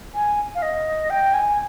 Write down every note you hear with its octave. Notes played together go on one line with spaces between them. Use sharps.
G#5
F5
D#5
G5
G#5